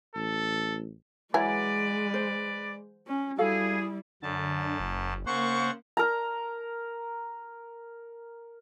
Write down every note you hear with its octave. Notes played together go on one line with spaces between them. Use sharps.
A1 A4
E3 F#3 G#3 B4 D5 G#5
C5
C#4
G3 E4 F#4 G#4 A4 F5
F#2 D3 A5
F#1
C#3 A#3 C5 F#5 C#6
A#4 A#5